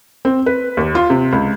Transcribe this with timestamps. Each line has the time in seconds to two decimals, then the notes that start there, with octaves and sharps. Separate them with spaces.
0.25 C4
0.46 B4
0.77 D#2
0.95 F4
1.10 C3
1.33 C#2